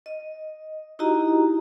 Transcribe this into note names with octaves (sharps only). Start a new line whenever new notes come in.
D#5
D#4 E4 F#4 G4 D#5 A#5